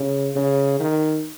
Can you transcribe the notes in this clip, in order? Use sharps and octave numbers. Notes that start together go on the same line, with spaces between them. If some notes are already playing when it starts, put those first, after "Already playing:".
Already playing: C#3
C#3
D#3